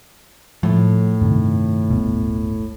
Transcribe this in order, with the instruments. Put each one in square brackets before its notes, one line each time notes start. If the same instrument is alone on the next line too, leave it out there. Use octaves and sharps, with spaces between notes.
[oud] A2 [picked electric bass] F3
[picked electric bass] G2 C3 D#3
D1 G1 B2